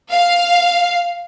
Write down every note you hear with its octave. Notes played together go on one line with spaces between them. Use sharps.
F5